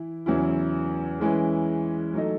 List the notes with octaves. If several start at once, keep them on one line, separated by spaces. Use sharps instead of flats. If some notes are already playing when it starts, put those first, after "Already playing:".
Already playing: E3 E4
E2 C#3 F#3 C#4 E4
E3 G#3 C#4 E4 B4
F#3 A3 D#4 A4 D#5